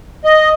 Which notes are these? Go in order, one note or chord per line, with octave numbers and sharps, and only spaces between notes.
D#5